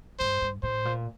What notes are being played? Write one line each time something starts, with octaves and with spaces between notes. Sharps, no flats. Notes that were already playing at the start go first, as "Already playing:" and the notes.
G2 C5
G2
A2 C5
A#2